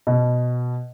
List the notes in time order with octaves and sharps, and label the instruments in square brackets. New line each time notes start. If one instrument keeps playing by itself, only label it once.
[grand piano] B2